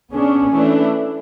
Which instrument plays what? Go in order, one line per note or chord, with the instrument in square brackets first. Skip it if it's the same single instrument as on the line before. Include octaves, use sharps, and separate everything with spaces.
[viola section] B3 D4 G#4 [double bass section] C#4
[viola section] E3 A3 D4